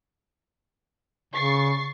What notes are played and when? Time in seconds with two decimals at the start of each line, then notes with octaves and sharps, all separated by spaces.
1.34 C#3 C#6 A6 C7